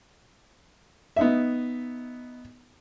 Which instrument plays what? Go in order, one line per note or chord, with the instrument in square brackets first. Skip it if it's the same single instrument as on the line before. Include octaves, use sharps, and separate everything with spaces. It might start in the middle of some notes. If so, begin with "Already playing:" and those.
[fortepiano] B3 D#4 E5